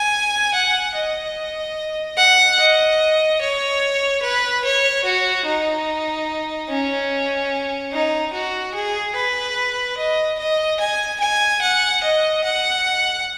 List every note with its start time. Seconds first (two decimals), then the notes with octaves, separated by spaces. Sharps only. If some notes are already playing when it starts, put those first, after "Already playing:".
Already playing: G#5
0.54 F#5
0.95 D#5
2.17 F#5
2.59 D#5
3.41 C#5
4.22 B4
4.64 C#5
5.04 F#4
5.45 D#4
6.69 C#4
7.93 D#4
8.33 F#4
8.75 G#4
9.15 B4
9.97 D#5
10.39 D#5
10.80 G#5
11.20 G#5
11.61 F#5
12.03 D#5
12.44 F#5